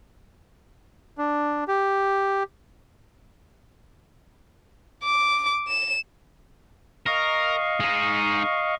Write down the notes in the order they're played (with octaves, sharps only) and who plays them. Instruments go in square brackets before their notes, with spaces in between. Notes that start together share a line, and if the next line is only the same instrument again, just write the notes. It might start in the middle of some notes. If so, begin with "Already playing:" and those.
[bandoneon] D4
G4
[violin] D6
E7
[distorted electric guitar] A#4 [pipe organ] D#5 F5 C#6
[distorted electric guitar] G#3 D#4